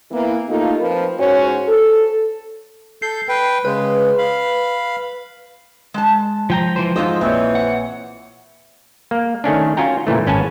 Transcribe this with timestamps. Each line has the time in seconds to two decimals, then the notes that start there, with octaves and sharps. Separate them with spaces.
0.11 E3 A#3 B3 E4
0.49 A3 A#3 D#4 F4 G4 A4
0.79 F3 C4 A#4 B4
1.18 G#2 C#4 F#4 C5 C#5
1.68 A4
3.02 A4 G6 C7
3.28 B4 G5
3.65 C#3 G#3 B4
4.18 F5 B5
5.94 G#3 A5
6.50 F3 G5 A#5
6.76 E3 F3 C5
6.96 G#2 F3 G#3 F4 C5 D#5 D#6 E6
7.21 A#1 E3 C4 C#5
7.55 F#5
9.11 A#3
9.44 D#3 A3 C#4 D4
9.77 C#4 F4 F#4 G5 A#5
10.07 A#2 C#3 E3 A3
10.27 G#1 C#4 B4 G#5 A5